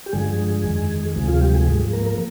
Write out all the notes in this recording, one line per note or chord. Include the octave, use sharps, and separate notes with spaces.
G4
G2 D3 F3 G#3 G#4
F2 D#3
D2 C3 F3 G#3 G#4
F4
G3 G4
G#3 G#4
G#2 F3 G#3 G#4
A#3 A#4
A#3 A#4